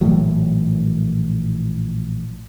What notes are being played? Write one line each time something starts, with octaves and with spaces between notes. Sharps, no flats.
A#1 A2 E3 F#3